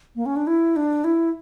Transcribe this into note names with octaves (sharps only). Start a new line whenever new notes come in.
A#3
C#4
D4
E4
D4
E4